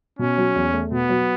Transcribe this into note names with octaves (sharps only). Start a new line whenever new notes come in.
B2 C#4
F#3
E2
A3
B2 B3
F#3